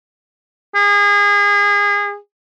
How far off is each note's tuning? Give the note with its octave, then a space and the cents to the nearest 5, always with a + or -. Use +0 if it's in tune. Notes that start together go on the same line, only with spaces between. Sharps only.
G#4 -30